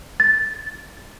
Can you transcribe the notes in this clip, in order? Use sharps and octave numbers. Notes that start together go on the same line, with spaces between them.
A6